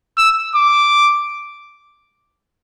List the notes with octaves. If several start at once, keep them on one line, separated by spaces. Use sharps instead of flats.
E6
D6